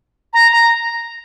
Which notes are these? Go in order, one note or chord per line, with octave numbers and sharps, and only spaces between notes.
A#5
A#5